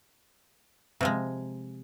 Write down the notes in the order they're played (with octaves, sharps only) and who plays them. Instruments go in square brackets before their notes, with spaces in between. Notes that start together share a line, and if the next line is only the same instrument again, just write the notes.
[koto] C3 F3 G#3